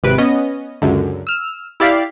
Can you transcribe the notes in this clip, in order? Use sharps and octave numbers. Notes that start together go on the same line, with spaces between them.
G#1 C3 B4 D7
B3 C#4 D#5
C#2 F#2 D3
E6 F6
E4 G4 D5 F5 B6 C7